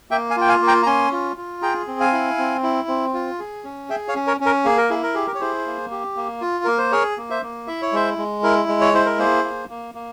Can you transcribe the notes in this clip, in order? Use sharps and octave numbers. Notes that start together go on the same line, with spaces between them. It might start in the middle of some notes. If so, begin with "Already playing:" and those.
A#3 E5 G5
F5 G#5
F4 G5
F5 G#5
A#3
G5 A#5
A#5
C#4 G#5 C6
F4
F4
G#4 G5 A#5
C4
F5 G#5
E4
C4
E4
C4
F4
G#4
C#4
G#4 E5 G5
C#5 F5
C#4
A#4 C#5
C#4
A#4
A#3 G#4
A#4
E4 G#4
A#4
G4 G#4
A#4
C#5
E4 G#4 C5
A#3
G4
A#3
F4
A#3 A#4
C5
G#4 A#4 C#5
A#3
C5 E5
A#3
E4 E5
C#5
G#3 C5 E5
G#3
E4 A#4
G#3
C#5
E4 C5
A#4
A#3 G#4 C5
A#3
A#3
A#3